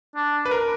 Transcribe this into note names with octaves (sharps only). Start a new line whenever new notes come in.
D4
B4
A#4